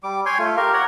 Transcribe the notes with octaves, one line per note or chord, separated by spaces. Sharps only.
G3 D6
C#5 G5 G#5 C6
A3 F4
G4 A#4 F5
A#4 C#5 F#5